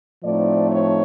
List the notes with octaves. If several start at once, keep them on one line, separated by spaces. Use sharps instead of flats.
A2 F3 A3 C4 D#4 D5
C#5